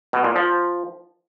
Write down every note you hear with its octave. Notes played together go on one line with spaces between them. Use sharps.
B2
A#2
F3